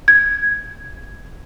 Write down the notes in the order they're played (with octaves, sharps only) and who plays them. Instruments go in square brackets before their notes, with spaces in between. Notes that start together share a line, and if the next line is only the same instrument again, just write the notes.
[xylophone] G#6